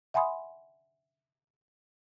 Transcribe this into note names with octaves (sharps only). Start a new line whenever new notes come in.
E5 F#5 G#5 B5 C6 D#6